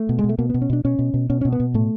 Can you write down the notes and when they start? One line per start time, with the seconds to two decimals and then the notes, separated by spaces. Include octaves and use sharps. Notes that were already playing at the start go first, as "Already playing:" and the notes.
Already playing: A3
0.09 B2
0.19 G#3
0.24 B2
0.29 A3
0.38 B2 A#3
0.50 B2 B3
0.62 C#4
0.70 B2 D4
0.85 B2 C#4
0.99 B2
1.14 B2
1.30 B2 C#4
1.41 B2 C#4
1.52 B3
1.60 B2
1.74 A2 A3